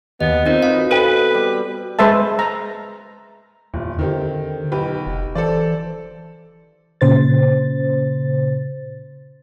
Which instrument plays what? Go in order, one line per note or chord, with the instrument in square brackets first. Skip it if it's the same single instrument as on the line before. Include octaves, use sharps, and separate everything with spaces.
[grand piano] D#2 [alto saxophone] B3 [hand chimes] D#5
[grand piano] C4 [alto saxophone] D#4 [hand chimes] F4 A#4 D#5
[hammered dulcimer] B2 B3 [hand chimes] F5
[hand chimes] A4 C5 [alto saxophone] B4 [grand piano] G5 D#7
[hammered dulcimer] G3
[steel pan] G#3 B4 C5 E5 A5
A#5
[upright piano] D#1 [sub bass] E2
[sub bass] D3 [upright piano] D#3 C4 G4
[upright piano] B1 G4 B4
[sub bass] F1
[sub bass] E3 [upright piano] A4 C5 D5
[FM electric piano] A#2 C#3 C5 A6